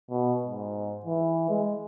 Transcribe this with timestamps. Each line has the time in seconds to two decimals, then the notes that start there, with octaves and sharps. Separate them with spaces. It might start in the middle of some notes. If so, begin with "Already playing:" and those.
0.10 B2
0.44 G#2
1.06 E3
1.50 G#3